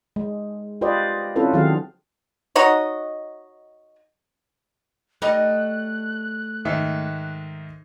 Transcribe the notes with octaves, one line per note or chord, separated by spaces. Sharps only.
G#3
F4 G4 B4 C5 D5 D#5
C4 C#4 E4 F4 A4 B4
D#3 F#3 C4 F#4 G#4 F5
D#4 F#4 C#5 D#5
G3 A3 D#4 D#5 F#6
G#2 D#3 E5